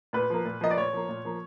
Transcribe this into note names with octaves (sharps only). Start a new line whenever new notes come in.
A#2 B4
F3 A#3
A#2
F3 A#3 D#5
D5
A#2 C#5
F3 A#3
A#2
F3 A#3